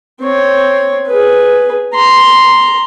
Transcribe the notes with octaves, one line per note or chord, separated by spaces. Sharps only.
C4 C#5
G#4 B4
A#5 C6